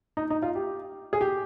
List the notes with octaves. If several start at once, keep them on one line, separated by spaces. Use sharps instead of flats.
D#4
D#4
F4
G4
G#4
G4